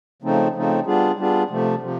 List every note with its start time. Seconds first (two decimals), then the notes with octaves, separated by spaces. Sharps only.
0.22 C#3 F3 A3 C4 D#4
0.55 C#3 F3 A3 C4 D#4
0.86 G3 B3 D4 F4 G#4
1.18 G3 B3 D4 F4 G#4
1.50 C3 F3 A3
1.82 C3 F3